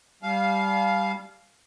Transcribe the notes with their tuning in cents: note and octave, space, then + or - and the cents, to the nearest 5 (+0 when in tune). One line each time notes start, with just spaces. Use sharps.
G3 +0 F5 +0 A5 -45